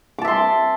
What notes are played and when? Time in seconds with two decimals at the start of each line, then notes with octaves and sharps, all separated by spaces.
0.19 D6
0.22 A5
0.25 E5
0.28 C6